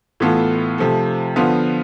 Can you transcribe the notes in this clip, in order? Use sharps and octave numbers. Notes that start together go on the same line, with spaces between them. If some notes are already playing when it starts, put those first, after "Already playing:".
A2 E3 B3 F4 A4
C3 F3 A3
D3 F3 B3 F4